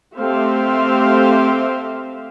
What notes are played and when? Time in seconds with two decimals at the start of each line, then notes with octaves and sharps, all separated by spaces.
0.17 A3 C4 G4 C5 E5 F5